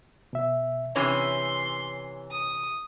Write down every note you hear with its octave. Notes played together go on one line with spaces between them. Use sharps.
B2 E5
C3 E3 C#4 C#5 C6
D#6